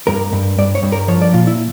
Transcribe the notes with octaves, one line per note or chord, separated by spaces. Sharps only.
G2 A#4
G2
G2 D5
C#5
G2
A#4
F3 C#5
D5
A#2 F4
E4